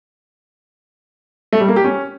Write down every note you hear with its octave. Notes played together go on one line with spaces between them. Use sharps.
A3
G3
A#3
G4
C#4